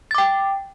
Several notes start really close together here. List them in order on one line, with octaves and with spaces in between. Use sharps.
A6 D6 G5